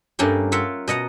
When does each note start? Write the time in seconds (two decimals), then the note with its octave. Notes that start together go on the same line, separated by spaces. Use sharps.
0.19 G2 A3 A#3 C#4 G4
0.52 A#3 F4 E5 F#5
0.88 B2 D#5 F#5 A#5